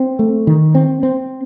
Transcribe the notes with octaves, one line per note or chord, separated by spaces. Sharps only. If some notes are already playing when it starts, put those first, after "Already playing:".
Already playing: C4
A3
D#3
C4
C4